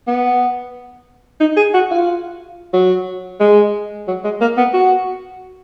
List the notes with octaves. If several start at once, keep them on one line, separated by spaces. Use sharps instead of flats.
B3
D#4
G#4
F#4
F4
F#3
G#3
F#3
G#3
A#3
B3
F#4